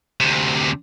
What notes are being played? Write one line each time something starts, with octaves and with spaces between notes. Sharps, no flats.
D2 C3